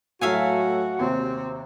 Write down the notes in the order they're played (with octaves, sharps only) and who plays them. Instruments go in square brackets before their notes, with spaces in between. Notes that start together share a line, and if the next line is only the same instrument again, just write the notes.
[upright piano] A2 F#3 [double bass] A3 [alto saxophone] F#4 [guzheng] E5 F5 G#5
[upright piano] D#2 C3 [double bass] C4